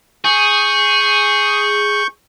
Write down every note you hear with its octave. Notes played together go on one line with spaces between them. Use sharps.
G#4 C#6 G6